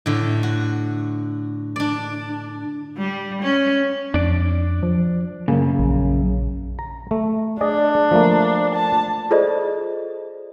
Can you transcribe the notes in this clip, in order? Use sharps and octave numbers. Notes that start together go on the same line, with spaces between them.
A2 D3
F#4
D4 D5
G3
C#4
F2 D4 D5
F3
F#2 A#2 C#3 A#3
A#1
A#5
A3
D4 G#4 D5 D#5
F3 A3 A#3
A5
F4 G#4 A4 C5 D5 D#5